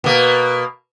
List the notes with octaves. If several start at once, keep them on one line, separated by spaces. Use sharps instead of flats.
B2 A#3